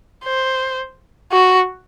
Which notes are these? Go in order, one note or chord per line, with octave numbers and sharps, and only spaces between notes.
C5
F#4